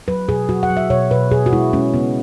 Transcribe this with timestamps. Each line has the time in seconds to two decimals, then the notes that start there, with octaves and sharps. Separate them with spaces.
0.08 F#3 B4
0.29 B2 G#4
0.49 F#3 F#4
0.63 F#5
0.70 F#3
0.77 E5
0.90 B2 C#5
1.11 B2 B4
1.31 B2 G#4
1.46 F#4
1.53 G#3 E4
1.73 G#3 C#4
1.94 C#3 B3